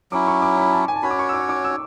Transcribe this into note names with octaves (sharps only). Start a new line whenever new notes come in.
F#3 C#4 E4 D6
C#6
D6
B5
A5
G#5
A5
C#4 F#4 C#5 B5
D6
C#6
E6
D6
D6
E6